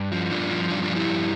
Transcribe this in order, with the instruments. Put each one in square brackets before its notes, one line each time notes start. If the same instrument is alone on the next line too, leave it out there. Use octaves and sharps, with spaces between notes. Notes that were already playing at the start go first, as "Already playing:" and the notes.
Already playing: [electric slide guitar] G2
F3
G2 D4 F4
F3
G2 D4 F4
D4 F4
F3
E4 G4
G2